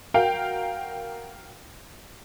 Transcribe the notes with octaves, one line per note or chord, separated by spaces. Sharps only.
F#4 A#4 F5 G5